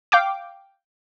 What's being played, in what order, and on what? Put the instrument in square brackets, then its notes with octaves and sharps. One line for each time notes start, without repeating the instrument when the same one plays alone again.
[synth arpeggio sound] F5 G5 D6